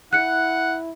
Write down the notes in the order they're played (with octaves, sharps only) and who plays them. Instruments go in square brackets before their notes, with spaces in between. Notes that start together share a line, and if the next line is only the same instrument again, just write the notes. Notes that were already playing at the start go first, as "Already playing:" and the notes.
[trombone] E4 [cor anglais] F#5 [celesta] F#6 C#7